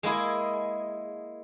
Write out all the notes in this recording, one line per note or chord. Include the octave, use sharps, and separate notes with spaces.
G#3 A#3 E4 G#4